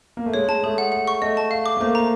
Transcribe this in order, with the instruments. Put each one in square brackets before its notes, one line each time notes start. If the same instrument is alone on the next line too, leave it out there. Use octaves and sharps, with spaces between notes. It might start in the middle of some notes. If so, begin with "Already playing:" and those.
[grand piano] A#3
A3
[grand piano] G#3 [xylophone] C#5
[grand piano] G#3 [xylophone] A5
[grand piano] A3 [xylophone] G#4
[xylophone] F#5
F#5
C#6
[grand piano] A3 [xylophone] D#5
[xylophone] A5
F5
D6
[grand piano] A3
[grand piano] A#3 [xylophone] C5
[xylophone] A#5